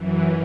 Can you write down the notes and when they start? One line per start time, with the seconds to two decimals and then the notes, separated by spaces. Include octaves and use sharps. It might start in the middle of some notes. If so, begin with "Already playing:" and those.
Already playing: F#2 E3